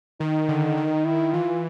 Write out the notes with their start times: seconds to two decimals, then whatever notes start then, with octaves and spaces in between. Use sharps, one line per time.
0.20 D#3 D#4
0.49 D3
0.77 D#3
1.05 E4
1.33 E3 F4